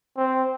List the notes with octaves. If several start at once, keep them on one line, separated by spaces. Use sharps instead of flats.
C4